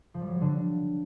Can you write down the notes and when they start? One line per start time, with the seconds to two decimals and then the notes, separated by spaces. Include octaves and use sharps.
0.14 F3
0.21 G3
0.28 F#3
0.34 G3
0.41 D3